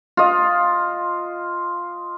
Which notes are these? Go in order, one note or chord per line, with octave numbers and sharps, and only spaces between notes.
F4 D#5